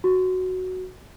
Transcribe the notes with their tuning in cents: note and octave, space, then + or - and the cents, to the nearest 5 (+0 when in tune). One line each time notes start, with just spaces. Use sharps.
F#4 +0